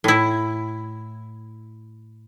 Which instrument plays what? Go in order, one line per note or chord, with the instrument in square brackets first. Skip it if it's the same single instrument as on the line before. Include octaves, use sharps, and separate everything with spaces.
[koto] A2 E4